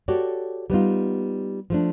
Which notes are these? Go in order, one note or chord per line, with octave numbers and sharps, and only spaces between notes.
F#4 G4 A4 C#5 D5
G3 B3 D#4 F4
F3 A3 D4